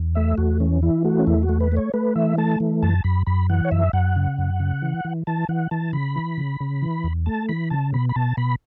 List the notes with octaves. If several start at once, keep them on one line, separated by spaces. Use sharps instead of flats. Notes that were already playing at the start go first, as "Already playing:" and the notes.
Already playing: E2
A3 E5
E2 F#4
E3 C#4
E3 E4
A3 F#4
C#4
E2 E4
F#4
A3
B4
A3 C#5
A3 B4
E3 E5
A3 A5
E3
F#2 A5
F#2 B5
F#2 B5
E3 F#5
C#5
F#2 E5
F#2 F#5
C#3
F#2
C#3
E3
E3
E3 A5
E3 F#5
E3 A5
C#3 B5
E3
C#3
C#3
E3
E2
A3 A5
E3 B5
C#3 A5
B2 B5
B5
B2 A5
B2 B5